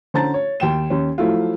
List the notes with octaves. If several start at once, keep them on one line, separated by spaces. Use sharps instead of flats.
D3 C#4 C5 A5 A#5 A6
C#5
D#2 G5 E7
D#2 C#4
F3 F#3 A3 E4 F4